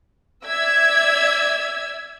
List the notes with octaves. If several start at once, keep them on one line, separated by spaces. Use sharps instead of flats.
D5 E5 E6 G#6